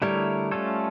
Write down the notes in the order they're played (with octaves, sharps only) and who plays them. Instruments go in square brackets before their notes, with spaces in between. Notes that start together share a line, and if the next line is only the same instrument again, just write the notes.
[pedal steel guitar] D3 A3 E4 A#4 C#5 [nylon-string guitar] G3
[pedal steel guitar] A3 C#4 F4 A4 C#5